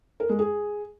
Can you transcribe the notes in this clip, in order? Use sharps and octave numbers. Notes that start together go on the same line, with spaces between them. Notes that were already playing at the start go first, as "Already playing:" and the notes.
A#4
G#3
G#4